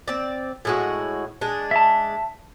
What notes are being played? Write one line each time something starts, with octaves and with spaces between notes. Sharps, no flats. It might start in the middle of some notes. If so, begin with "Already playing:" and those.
C4 D5
A2 G#3 F#4
G#3 D4
E5 A5